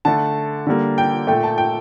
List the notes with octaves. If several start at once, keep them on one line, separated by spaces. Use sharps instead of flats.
D3 A3 A5
D3 G3 A#3
G5
A#2 A3 G5
A5
G5